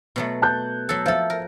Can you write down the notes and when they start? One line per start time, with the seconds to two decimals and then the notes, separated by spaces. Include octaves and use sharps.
0.16 B2 F#3 A3
0.42 A5 F#6 G6
0.89 F#3 A4
1.06 F3 A4 E5 F5
1.30 A#4